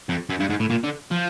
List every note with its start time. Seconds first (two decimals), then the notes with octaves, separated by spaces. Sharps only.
0.09 F2
0.29 F#2
0.40 G2
0.50 G#2
0.60 A2
0.70 A#2
0.84 D3
1.11 F3